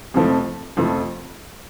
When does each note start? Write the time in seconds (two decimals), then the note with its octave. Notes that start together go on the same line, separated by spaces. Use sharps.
0.14 F2 C3 F3 A3
0.77 F2 C3 F3 A3